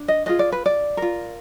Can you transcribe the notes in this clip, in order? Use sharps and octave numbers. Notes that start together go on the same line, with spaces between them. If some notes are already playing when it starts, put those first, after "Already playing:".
Already playing: D4
D#5
F4 G#4 B4 D#5
D5
B4
D5
F4 A#4